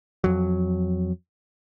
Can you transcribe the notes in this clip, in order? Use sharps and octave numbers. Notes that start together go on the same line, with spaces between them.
F2 F#3